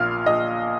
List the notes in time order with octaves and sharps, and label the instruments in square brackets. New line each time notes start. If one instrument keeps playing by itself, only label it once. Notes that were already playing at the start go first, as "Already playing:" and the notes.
Already playing: [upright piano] A#1 A#2 F5 F6
A#1 D#5